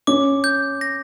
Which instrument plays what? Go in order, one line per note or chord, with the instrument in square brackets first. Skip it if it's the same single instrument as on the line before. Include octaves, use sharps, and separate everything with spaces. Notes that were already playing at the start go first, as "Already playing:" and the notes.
[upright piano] C#4 [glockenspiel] D6
[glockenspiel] G6
A#6